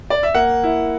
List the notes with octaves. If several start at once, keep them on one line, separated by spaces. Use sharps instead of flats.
D5
E5
A#3 F#5
E4